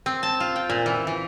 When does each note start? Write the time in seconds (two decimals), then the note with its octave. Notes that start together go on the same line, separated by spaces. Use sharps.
0.06 C4
0.23 A5
0.40 F4
0.56 G5
0.69 A#2
0.86 E3
1.07 E3